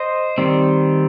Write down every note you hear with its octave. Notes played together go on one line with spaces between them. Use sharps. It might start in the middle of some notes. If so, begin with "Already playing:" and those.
Already playing: C5 D#5
D#3 G3 C4